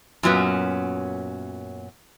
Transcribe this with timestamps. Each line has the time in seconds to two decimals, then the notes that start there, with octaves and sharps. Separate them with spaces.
0.23 F#2 A#2 F#3 B3 C#4